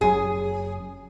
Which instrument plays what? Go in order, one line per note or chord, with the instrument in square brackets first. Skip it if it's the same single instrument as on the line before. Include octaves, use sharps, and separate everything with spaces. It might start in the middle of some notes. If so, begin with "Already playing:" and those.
[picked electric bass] F#1 F#2 [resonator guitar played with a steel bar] G#4